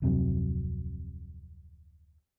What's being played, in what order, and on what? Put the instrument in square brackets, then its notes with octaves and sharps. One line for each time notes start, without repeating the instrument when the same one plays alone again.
[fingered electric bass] D1 F2 C3 F#3